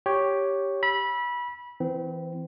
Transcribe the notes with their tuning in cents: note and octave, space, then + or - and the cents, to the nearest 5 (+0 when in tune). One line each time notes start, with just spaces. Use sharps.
G4 +0 C#5 +0 G5 +0
B5 -25 E6 +0
E3 +0 C4 -25